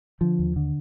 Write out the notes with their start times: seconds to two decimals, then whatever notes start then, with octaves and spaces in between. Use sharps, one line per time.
0.21 D3 F3
0.39 D#2
0.56 D3